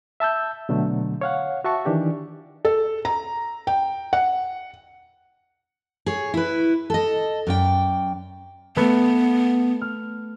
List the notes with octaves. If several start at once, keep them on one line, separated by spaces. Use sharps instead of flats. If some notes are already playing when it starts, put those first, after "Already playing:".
E5 A5 E6 G6
B2 D3 F#3 A3
C#5 F5 F#5
F#4 E5 A5 C#6
D#3 E3 D4 G4
A4
A#5
G5
F#5
G#4 C#5
E4 B4
A4 D#5
F#2 D5 G5
A3 B3 B4
F6